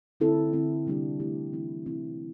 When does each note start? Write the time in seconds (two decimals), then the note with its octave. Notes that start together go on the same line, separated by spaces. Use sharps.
0.20 D3 C4 E4 A4
0.53 D3 C4 E4
0.86 C3 G3 D4 G4
1.20 E3 A3 E4 G4
1.53 E3 C4 E4
1.86 C3 E3 C4 E4